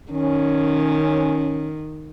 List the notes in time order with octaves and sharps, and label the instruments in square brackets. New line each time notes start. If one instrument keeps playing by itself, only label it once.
[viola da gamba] D#3 [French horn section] C#4